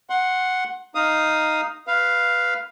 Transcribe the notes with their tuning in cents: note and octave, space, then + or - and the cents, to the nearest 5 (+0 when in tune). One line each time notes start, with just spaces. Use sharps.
F#5 +0 C6 +25
D#4 +0 F5 +0 D#6 +0
B4 +0 F5 +0